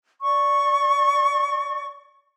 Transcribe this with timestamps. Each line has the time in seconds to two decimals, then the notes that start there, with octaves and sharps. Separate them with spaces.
0.22 D5 C#6